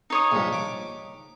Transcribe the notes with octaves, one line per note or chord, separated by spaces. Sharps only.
D#4 C#5 D#6
A#1 G2
D6